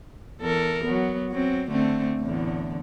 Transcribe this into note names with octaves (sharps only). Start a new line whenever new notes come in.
E2 A4 A#4
F#3 B3
F#3 C4
D3 A3 C4
E2 A2 D3